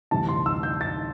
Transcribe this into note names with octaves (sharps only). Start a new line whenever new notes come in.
D2 C3 E3 G3 A5
C6
E6
G6
A6